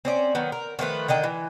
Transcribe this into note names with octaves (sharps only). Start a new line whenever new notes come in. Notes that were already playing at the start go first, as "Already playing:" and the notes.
C4 C#4 D5
D#3 F#3 B3
A#4
D#3 F3 A3 B4
D3 D#3 D#5 G5
E3